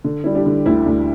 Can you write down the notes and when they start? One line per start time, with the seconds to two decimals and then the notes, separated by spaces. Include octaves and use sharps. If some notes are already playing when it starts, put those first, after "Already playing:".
0.04 D3
0.24 G3 E4
0.35 D4 G4
0.46 D3
0.66 D2 E4
0.86 D2